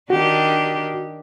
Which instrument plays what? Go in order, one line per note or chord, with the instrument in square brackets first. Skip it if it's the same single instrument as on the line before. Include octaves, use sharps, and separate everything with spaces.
[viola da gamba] D#3 D4 G4 [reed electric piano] F#4